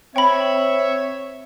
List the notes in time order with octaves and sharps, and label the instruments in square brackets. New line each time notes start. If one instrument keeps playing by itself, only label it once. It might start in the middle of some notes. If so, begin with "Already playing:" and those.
[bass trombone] C4 [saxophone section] C#5 [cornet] E5 [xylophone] G5 B5